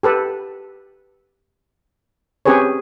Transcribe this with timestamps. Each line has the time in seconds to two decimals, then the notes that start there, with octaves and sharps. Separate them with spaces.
0.03 G4 A4 B4
2.46 C4 C#4 G4 G#4 B4 C#5